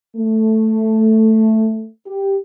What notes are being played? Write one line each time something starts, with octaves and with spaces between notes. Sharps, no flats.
A3
G4